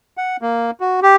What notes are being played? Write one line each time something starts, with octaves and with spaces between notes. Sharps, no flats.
F#5
A#3
F#4
G4